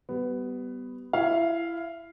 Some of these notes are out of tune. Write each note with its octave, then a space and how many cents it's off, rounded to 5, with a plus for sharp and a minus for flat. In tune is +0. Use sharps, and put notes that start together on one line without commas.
G3 -25 B3 +10
E4 +25 F5 +0